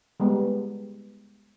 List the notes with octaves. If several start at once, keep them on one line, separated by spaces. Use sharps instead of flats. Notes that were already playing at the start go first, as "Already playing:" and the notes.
G3 G#3 B3